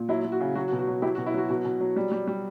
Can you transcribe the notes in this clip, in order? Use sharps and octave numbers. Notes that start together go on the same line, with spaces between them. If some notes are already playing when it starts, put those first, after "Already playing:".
Already playing: A#2
F#3 E4
F#3
F#4
C#3
F#3 F#4
F#4
B2
F#4
F#3
F#3 E4 G4
F#4
B2
E4
F#3 F#4
B2 F#4
B2
F#3
G3
G3
G3